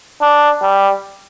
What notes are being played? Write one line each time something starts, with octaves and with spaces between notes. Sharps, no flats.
D4
G3